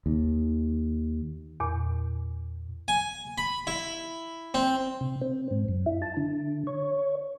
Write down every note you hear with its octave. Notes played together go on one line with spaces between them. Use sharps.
D#2
E2 A#2
G#5
B5
E4
C4
C3
C4
G#2
F#2
E4
A5
D3
C#5